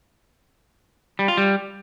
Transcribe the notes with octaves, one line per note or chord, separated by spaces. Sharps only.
G3
F4
G3